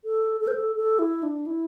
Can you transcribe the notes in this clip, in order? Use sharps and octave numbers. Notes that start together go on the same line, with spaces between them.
A4
A4
C5
A4
A4
E4
D4
E4